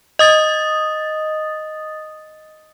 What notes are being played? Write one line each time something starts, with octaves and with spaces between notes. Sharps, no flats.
D#5 D#6 A6